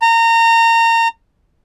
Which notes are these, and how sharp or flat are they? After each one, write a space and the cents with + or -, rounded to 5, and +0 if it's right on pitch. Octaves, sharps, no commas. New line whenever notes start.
A#5 -25